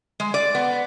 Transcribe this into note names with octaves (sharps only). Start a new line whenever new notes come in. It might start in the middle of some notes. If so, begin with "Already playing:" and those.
G#3
D5
B3